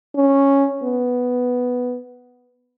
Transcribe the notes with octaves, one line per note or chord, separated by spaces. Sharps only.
C#4
B3